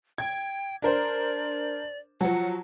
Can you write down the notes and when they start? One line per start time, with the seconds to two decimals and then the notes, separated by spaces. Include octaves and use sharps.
0.18 G5 G#6
0.82 D4 A#4 C5 D5
2.21 F3 F#3 F#5